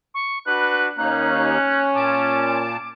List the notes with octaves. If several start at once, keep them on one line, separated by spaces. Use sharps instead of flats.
C#6
D4 F#4 B4 F#6
D#2 A#3 C#4 D#4 F#6
A#2 A5 D6